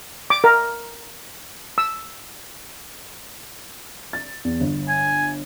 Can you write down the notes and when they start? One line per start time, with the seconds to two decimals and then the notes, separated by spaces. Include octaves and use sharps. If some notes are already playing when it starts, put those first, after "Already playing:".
0.30 D6
0.44 A#4
1.78 E6
4.13 A6
4.45 E2
4.60 G1
4.88 G#5